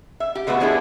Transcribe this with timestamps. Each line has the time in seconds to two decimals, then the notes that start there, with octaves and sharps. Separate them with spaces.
0.20 E5
0.35 G4
0.47 G#3 A3 B3 F#4 B4
0.60 F3 B3 D4 E4 G#4 A4